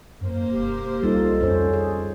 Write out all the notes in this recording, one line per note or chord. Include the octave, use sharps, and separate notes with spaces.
F#2 A#3 C5
E1 G4
C2 G3 D#4 F4 A4
F2 C#4 C5
G#4